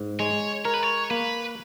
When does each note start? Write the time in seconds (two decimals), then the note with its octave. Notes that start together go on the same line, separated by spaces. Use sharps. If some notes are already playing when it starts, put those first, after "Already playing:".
Already playing: G#2
0.19 G#3 C#5
0.65 A#4 C#5
0.74 B4
0.83 C#5
1.10 A#3 B4